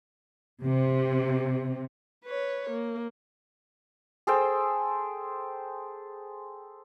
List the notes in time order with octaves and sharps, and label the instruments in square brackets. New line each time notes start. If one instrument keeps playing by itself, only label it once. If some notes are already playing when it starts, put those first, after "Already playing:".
[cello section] C3
[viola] B4 C#5
A#3
[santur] G#4 A4 C5 G5